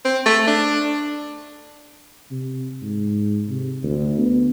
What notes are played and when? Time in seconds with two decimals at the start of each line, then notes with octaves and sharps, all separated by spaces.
0.05 C4
0.26 A3
0.47 D4
2.31 C3
2.82 G#2
3.49 C3
3.84 D2
4.18 B3